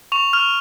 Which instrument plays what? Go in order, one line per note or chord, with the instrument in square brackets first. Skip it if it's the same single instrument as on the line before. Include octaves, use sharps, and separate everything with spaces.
[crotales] C#6 F7
F6 F7